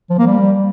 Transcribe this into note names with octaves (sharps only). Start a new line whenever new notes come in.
F3
A#3
G3